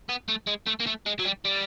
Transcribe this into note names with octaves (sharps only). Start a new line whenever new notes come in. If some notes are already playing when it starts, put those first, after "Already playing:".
B3
A3
G#3
A3
A#3
A3
G#3
F#3
G3
G3